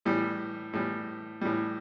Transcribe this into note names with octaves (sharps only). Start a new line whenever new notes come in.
A2 E3 G3
A2 E3 G3
A2 E3 G3